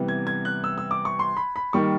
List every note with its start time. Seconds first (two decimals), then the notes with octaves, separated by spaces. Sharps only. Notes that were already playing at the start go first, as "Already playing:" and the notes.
Already playing: C3 E3 G3 B3
0.08 G#6
0.27 G#6
0.45 F#6
0.64 E6
0.78 E6
0.91 D6
1.05 C#6
1.19 C6
1.37 B5
1.56 B5
1.73 D#3 G3 A#3 C#6